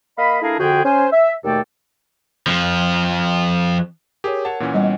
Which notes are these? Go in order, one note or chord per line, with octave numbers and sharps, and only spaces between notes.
A#3 D#5 F5 B5
A3 D4 E4 G#4 A#4 F5
F2 D3 F#4 G#4 G5
C#4 C5 G#5
E5
D#2 B2 A3 A4 D5 G5
F2 F3
G4 G#4 A#4 C#5
C#5 F#5 A5
A#2 E3 C#4
G3 B3 C#5 D#5 F#5 G5